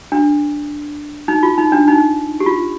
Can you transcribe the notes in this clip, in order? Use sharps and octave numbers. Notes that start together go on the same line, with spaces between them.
D4
D#4
F4
D#4
D4
D#4
G4
F4